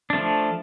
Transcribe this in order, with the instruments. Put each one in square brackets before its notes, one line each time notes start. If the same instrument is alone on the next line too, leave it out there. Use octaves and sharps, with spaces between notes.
[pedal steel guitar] F3 A3 D4